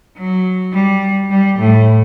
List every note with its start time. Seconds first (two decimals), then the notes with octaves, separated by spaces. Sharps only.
0.17 F#3
0.73 G3
1.30 G3
1.59 A2